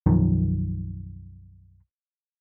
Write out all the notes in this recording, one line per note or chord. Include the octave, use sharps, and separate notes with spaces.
B1 F#2 D#3 F3